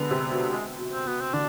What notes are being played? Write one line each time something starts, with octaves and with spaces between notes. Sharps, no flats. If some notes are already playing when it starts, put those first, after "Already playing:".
Already playing: D3 G#3 B3
C3
B2
G#3
B2
C4
B2 B3
C4
D3 D4